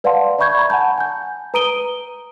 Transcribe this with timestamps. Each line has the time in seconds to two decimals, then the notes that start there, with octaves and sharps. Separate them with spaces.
0.04 B4 D5 F5 F#5 A5 C6
0.39 D5 E5 B5 C#6 G6 G#6
0.58 A#5 B5
0.70 F#5 G#5 A5 G6
0.98 G#5 G6
1.54 B4 A#5 D#6 D7 D#7 G7